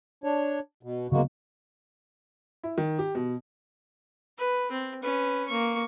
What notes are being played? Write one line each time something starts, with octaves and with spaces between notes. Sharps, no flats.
D4 C#5
B2
C#3 F#3 G#3 A#3 B3 F#4
E4
D#3
G4
B2
B4
C4
C#4 B4
A#3 C#6